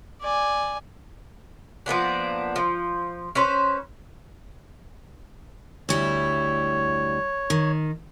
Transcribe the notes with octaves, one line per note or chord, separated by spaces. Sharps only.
D5 G#5
F3 A#3 B3 D4
F3
C#4 B4 C5
D2 G3 E4 C#5
D#3